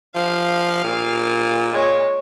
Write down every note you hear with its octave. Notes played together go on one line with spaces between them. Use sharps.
F3 F5
A#2
G#3 C#5